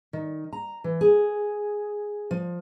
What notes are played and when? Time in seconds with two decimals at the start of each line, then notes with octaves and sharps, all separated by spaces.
0.13 D#3
0.53 A#5
0.84 E3
1.01 G#4
2.31 F3